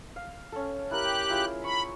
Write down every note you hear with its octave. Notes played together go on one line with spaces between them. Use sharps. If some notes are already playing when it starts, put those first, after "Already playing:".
F5
C#4 A4
E4 G4 A#4 F#6
E4 F4 G#4
B5 C#6